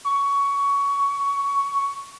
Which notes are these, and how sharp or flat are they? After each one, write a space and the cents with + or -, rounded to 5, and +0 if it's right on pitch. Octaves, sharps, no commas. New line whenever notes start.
C#6 +15